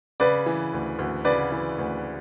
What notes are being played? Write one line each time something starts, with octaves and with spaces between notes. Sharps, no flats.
C#3 B4 D5
E3
D2
D2
C#3 B4 D5
E3
D2